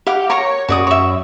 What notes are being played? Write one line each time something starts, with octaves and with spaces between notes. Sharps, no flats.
G4 F5 F#5 D6
A#4 C#5 A#5 C#6
F#2 F#4 D5 D#6
C#5 E5